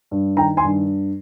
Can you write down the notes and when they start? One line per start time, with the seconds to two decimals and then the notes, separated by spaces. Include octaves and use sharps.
0.11 G2
0.37 D#3 G5 A#5
0.57 G#5 C6
0.64 G2